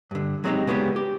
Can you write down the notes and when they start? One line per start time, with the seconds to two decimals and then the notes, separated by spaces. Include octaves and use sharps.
0.11 G2 D3
0.44 F#3 G#3 C4 C#4 D#4 G4
0.67 C#3 G#3 B3 D4 F4 G4
0.96 G4